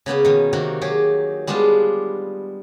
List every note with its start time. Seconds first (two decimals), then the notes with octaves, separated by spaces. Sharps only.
0.06 C#3 A#3 B3 C#4
0.25 B2 D#3
0.53 C3 D#3 A#3 F#4
0.82 F#3 G4 G#4
1.47 G3 G#3 B3 D4 F4